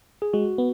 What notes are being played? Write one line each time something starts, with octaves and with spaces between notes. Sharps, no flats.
G#4
G#3 F#4
B3